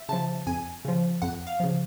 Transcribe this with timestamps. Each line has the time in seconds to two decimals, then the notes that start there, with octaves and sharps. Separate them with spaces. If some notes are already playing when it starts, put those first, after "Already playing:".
Already playing: E5
0.09 C#3 F3 A5
0.47 F2 G#5
0.85 C#3 F3
1.22 F2 F#5
1.47 F5
1.60 C#3 F3